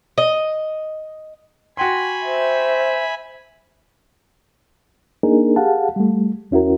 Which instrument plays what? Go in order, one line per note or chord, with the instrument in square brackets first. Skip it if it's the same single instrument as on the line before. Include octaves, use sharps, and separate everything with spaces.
[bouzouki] D#5
[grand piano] F#4 G5 C6 [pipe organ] G#5 B5
[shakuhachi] C5 [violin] E5
[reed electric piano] A#3 D4 D#4 G#4 A#4
G4 G#4 F5 F#5 A5
G3 A3
E2 C#4 E4 F#4 A#4